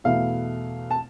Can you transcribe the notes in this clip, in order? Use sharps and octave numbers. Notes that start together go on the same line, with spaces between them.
E2 B2 A3 E4 F5
A5